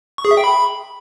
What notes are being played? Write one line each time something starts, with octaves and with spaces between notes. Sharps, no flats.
C#6
G#4
E5
G5
B5